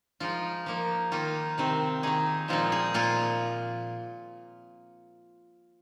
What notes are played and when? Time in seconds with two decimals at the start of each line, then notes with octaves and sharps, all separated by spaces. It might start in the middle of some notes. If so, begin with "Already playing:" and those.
0.20 F3 G#3 D#4 F4
0.66 F3 A#3 D#4
1.12 D#3 A#3 D#4 F4
1.58 C3 D#3 C4
2.03 D#3 A#3 D#4 G#4
2.48 A#2 F3 G#3 C4 D#4 F4
2.72 G#4
2.94 A#2 F3 A#3 F4